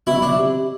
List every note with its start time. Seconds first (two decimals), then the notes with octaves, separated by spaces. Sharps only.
0.07 B2 E4
0.22 D4
0.38 C3